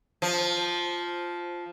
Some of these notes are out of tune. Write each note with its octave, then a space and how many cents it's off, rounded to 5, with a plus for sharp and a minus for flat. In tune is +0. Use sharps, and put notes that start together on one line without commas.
F3 +0